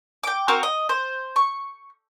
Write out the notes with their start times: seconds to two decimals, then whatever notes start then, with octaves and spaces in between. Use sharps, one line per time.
0.24 G5 D6
0.48 C4 F#4 A#4
0.63 D#5
0.89 C5
1.36 C#6